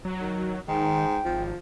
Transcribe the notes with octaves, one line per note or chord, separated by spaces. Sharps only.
F#3
D#3
G#2 D#3 G5
G#1 F3